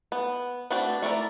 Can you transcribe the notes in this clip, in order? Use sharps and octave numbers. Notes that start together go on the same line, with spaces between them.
B3
A3 C4 D4 F#4 B4
A3 E4 A#4 D5